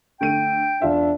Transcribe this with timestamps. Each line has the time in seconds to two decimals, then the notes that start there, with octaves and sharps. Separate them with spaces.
0.21 D3 A3 G5 D#7
0.82 E1 D4 F4 E5